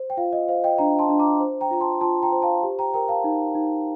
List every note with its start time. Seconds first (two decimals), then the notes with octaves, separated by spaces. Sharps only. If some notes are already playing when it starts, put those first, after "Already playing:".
Already playing: C5
0.10 G5
0.17 F4 F5
0.33 D#5
0.48 C5 F5
0.64 D#5 G5
0.78 D4 G5 A#5
0.99 A5 C6
1.09 D4
1.19 A#5 D6
1.40 C5
1.61 G5 A#5
1.71 F4 A#5
1.81 A5 C6
2.01 F4 A5 C6
2.23 G5 A#5
2.32 C5
2.42 F5 A5
2.63 G4
2.79 G5 A#5
2.94 A#4 G5 A#5
3.09 F5 A5
3.24 D#4
3.55 D#4